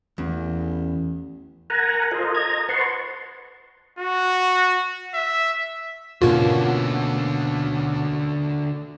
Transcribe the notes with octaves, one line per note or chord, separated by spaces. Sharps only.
A1 E2
A#4 F#5 G#5 A#5
F4 A4 A#4 C5 D#5
D#5 A#5 G#6
B4 C5 F#5 A5 C6 C#6
F#4
E5
G#2 B2 D3 A#3 C#4 F4 F#4